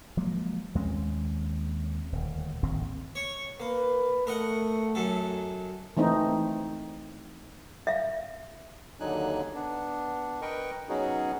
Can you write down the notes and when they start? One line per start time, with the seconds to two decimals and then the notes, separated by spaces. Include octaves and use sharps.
0.17 F3 F#3 G#3 A#3
0.75 D#2 G#3 C4 C#4
2.12 D#1 D2
2.63 D1 G#1 D#2 C4
3.15 C#5 C#6
3.60 A#3 B4
4.27 A3 A#4 D#5 F#5
4.95 F#2 F#3 A4
5.97 E3 A3 C4 D#4
7.87 E5 F5
9.00 D#2 D3 F#3 D#4 G#5 F#6
9.54 B3 D4
10.42 A#4 B4 D#5 G5 C#6
10.89 F#3 B3 C#4 D#4 F#4 G#4